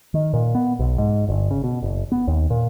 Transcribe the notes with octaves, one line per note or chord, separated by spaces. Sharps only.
D#3
A#2
B3
B1
G#2
G1
C#3
B2
F#1
B3
D#2
A#2